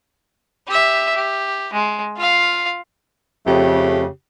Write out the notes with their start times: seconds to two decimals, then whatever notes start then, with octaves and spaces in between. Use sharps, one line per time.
0.67 G4 E5
1.16 G4
1.73 G#3
2.17 F4 F5
3.46 F2 C#3 A3 G4